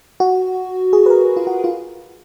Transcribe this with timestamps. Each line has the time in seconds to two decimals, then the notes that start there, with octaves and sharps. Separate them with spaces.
0.20 F#4
0.93 G#4
1.06 B4
1.10 A#4
1.37 F4
1.47 F#4
1.64 F4